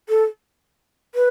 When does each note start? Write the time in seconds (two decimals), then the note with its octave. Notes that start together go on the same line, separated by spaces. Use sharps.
0.09 A4
1.15 B4